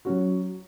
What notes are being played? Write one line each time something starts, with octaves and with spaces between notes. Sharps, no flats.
F#3 C#4 F#4